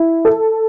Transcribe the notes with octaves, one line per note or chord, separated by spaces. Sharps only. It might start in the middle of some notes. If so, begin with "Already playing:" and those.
Already playing: E4
A4